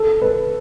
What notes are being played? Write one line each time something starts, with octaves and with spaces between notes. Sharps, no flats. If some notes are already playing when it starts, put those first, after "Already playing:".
Already playing: A4
B4